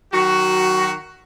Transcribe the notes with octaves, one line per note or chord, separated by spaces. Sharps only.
D#3 F#3 F#4